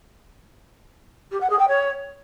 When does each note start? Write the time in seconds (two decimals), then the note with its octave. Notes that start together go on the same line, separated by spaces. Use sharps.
1.31 G4
1.40 F#5
1.49 G#4
1.59 G5
1.68 C#5